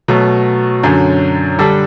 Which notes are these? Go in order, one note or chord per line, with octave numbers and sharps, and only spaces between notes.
B2 F#3 A3
F#2 D3 F#3
D3 G3 D4 A4